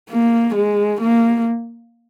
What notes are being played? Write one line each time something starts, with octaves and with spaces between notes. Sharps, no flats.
A#3
G#3
A#3